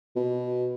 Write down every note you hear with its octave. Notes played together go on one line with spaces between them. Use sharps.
B2